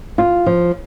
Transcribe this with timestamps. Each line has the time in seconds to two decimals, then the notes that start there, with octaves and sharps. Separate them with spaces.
0.18 F4
0.46 F3